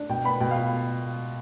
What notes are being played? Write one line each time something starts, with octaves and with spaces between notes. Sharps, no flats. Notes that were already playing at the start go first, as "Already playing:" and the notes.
Already playing: D4
B2 G5
B3 B5
B2 G5
F5
F4